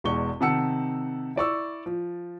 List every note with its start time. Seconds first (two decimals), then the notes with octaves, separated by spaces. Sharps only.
0.04 E1 E2 G#3 C#6 G7
0.41 C3 D#3 F#5 A5 E6 C#7
1.36 E4 D5 C#6 E6
1.86 F3